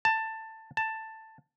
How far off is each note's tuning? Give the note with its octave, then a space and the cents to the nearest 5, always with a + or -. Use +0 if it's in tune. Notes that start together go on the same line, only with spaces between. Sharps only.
A5 +15
A5 +10